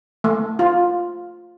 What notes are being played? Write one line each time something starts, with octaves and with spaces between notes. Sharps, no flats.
A3
F4